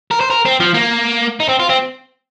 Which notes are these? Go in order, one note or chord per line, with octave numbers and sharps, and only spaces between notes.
A#4
C5
A#4
C4
F3
A#3
D#4
C4
F4
C4